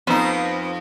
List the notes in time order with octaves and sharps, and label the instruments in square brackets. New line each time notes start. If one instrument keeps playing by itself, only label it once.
[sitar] F2 D#4 [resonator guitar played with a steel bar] B3 B4 C5